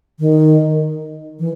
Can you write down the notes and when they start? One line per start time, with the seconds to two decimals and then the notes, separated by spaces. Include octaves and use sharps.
0.20 D#3
1.39 E3